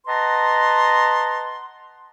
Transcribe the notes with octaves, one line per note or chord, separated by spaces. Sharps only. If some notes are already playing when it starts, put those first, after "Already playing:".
B4 D#5 F#5 A5 A#5 C6